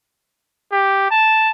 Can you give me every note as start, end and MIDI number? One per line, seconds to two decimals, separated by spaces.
0.72 1.06 67
1.11 1.51 81